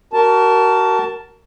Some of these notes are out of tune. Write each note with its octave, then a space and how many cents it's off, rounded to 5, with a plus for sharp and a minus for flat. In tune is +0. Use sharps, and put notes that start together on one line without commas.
F#4 +35 A#4 +0 A5 +0